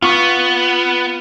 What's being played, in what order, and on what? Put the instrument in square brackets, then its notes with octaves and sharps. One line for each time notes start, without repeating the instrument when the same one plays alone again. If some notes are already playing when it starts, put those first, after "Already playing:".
[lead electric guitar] B3 [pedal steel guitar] F4 C#6